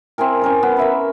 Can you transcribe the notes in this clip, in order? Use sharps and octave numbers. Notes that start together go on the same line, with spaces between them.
C4 E4 G#4 A#4
C#4 A#4 A#5
B3
A#4 E5 B5